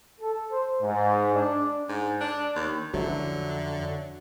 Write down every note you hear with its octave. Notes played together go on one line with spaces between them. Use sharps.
A4
C5
G#2
D4
G#2
D4
D#2
F2 D3 F#3 C#4 E4